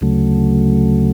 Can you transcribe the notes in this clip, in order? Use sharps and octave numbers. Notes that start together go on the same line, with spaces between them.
D2 C#3 F#3 A3